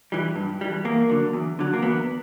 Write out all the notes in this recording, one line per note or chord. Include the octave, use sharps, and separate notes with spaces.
E3 G3
G2
E3 G3
E2 A#3
D3 F#3
E2
D3 F#3
A#3
E2 B3